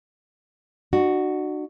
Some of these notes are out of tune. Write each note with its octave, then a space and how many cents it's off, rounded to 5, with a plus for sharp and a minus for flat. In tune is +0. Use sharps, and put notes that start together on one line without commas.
D4 +45 F#4 +0